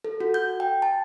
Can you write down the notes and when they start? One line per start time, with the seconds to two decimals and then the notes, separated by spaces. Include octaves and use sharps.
0.04 A4
0.20 F#4
0.34 G6
0.60 G5
0.82 A5